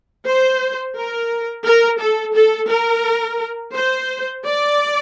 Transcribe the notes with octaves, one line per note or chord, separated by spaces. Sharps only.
C5
A#4
A#4
A4
A4
A#4
C5
D5